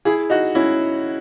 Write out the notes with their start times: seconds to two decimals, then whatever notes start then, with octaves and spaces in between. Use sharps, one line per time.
0.05 E4 G#4
0.30 D#4 F#4
0.55 C#4 E4